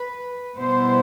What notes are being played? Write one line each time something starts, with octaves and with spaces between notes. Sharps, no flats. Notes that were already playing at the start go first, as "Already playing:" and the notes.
Already playing: B4
B2 G3 B3 E4 C5